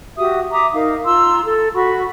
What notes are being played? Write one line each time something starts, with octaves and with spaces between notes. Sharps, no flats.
F#4 G4 E5 D#6
E5 A#5 D6 D#6
D#4 A#4 F5
F4 A#5 C6 E6
A4
F#4 B5 C#6